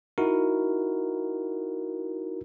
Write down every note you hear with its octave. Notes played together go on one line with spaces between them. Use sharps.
D#4 E4 F#4 A#4